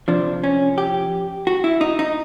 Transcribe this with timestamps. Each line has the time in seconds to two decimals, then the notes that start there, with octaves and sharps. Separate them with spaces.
0.08 F2 C3 F3 D4
0.44 C#4
0.78 G4
1.47 F#4
1.64 E4
1.81 D#4
1.99 D#4